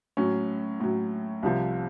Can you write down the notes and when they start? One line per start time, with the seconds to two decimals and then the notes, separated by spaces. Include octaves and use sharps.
0.17 A2 F#3 C#4
0.80 A2 F#3
1.43 C2 C3 F3